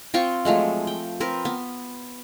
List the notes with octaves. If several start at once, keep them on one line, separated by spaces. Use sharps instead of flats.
C4 F4 G5 C#6
F3 F#3 G#3 A3
G5
C4 A#4 B4
B3